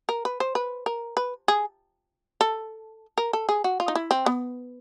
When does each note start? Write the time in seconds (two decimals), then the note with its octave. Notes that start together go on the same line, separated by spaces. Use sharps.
0.09 A#4
0.25 B4
0.40 C5
0.55 B4
0.86 A#4
1.17 B4
1.48 G#4
2.41 A4
3.18 A#4
3.33 A4
3.49 G#4
3.64 F#4
3.80 F4
3.88 D#4
3.95 E4
4.11 C4
4.26 B3